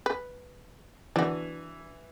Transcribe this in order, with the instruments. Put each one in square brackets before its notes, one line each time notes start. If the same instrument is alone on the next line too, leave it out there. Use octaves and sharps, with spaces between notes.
[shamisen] B4
[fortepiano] E3 [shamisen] D4 F#4